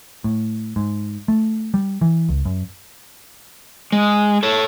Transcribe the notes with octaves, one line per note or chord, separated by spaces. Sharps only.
A2
G#2
A3
G3
E3
C#2
F#2
G#3
A4 C#5